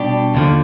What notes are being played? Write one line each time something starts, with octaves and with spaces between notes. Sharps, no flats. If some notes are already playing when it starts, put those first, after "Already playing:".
Already playing: B2 G3 D4 G4
D#2 D3 F3